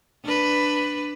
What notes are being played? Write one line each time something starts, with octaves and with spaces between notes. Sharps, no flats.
D4 B4